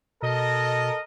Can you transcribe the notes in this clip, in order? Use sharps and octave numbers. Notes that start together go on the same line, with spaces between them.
B2 A4 A#4 D#5